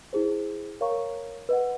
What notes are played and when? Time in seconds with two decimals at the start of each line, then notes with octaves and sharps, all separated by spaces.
0.13 E4 G#4 C5
0.81 A#4 C#5 F5 A#5 C#6
1.49 B4 D#5 F#5